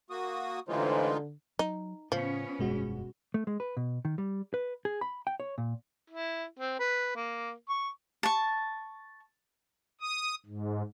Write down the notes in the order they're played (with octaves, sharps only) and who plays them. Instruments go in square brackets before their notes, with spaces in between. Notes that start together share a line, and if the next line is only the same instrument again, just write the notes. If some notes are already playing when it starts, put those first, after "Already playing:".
[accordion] A#3 F#4 D#6
[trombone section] A1 E3 C5 [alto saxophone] D3 [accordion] G#3 D#4 F4
[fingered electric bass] F#3 [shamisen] D#4
[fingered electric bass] A2 C#3 [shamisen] F3 [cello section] B3 C#4
[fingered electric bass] F1 G2 [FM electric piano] B2 G#3 F#4
[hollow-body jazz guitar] A3
G#3
B4
B2
D#3
G3
B4
G#4
B5
G5
C#5
A#2
[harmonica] E4
C4
B4
A#3
C#6
[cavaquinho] A5 C#6
[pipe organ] D#6
G#2